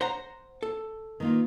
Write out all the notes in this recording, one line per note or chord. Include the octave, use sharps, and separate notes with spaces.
C5 F#5 A#5
A4
D#3 A#3 F4